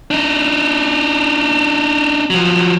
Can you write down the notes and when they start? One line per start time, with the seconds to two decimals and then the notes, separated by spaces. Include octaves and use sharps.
0.11 D4 D#4
2.30 F3 F#3